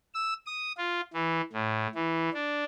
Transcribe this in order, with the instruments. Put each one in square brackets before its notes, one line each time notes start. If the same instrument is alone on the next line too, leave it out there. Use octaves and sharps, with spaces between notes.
[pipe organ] E6
D#6
F4
E3
A2
E3
D4